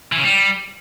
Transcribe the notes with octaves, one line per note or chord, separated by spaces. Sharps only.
E3
C#3
G3